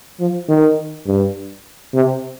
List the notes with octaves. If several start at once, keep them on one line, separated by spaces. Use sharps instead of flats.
F3
D#3
G2
C3